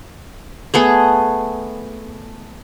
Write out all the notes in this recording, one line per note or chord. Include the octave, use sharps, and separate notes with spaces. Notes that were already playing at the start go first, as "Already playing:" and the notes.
A3 B3 G#4